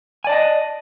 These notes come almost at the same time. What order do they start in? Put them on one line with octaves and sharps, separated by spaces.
G#5 D5 A5 D#5